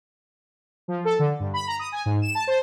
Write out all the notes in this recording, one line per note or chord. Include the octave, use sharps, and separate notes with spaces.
F3
A4
D3
G2
B5
A#5
D#6
G#5
G#2
E7
A5
C5